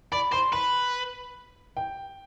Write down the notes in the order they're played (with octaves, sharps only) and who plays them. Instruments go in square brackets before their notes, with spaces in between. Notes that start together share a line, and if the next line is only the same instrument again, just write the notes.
[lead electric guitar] D5 [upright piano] B5
[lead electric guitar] C5 [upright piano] C6
[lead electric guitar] B4 [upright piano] B5
[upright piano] G5